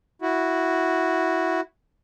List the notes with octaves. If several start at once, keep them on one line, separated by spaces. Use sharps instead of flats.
E4 F#4